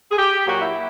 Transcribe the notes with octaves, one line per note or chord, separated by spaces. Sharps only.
G#4
G4
A#2 F#3 F#4
E4